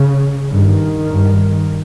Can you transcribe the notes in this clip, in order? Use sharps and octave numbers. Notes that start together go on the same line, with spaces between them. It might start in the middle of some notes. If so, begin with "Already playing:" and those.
Already playing: C#3
G2 D#3
G2